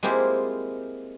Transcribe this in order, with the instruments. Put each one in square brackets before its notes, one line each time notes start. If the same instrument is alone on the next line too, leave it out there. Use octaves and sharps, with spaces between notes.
[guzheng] G#3 A#3 C4 E4 F4 G4